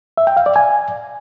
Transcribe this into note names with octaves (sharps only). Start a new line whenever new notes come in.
E5
G5
F5
D5
G#5